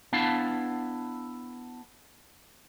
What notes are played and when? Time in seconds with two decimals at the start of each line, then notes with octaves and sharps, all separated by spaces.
0.13 B3 D4 E4 F5 A5